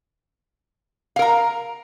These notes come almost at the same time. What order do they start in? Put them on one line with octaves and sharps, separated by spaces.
F5 A#4 A#5